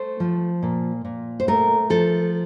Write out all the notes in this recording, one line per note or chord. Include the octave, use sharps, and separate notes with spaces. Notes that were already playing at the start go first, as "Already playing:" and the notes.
Already playing: A3 C5
F3
A#2
A#2
C5
A3 A#4
F3 A4